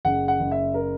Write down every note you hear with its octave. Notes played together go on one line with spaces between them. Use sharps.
F#1 F#5
F#5
F#1
E5
A#4